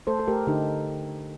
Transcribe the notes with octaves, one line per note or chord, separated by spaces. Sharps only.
A3 A4 C5
A4
A3 G4 A#4
D3 D#4 G4